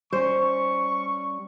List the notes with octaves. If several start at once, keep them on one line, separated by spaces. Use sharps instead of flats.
G3 C#4 C5 C#6